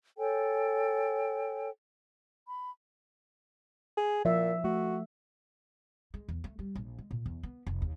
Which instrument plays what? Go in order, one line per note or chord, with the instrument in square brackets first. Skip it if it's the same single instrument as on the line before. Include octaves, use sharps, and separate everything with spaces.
[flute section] A4 C#5 G5 G#5
B5
[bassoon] G#4
[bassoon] A#2 [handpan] F3 E5
[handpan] A3 [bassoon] F#4
[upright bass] G#3
E2
A3
G3
A#1
G#3
A#2
E2
B3
F1
D#2